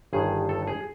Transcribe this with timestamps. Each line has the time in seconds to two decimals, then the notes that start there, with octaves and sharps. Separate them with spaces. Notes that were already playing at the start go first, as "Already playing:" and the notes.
0.13 G1 G2 D#3 G#4
0.49 A4
0.67 G#4